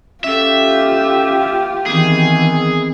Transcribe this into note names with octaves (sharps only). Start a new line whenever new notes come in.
C#4 F4 G4 A4 E5
D#3 E3 B3 C4 G#4